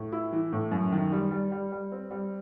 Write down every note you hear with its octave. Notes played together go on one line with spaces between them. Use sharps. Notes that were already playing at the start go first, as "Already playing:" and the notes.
Already playing: A2
E4
E3
A2
F#2
D#3
G3
G3
G3
G3
C4
G3